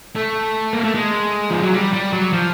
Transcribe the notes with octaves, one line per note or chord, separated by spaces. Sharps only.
A3
A#3
A3
G#3
F3
F#3
G3
G3
F#3
F3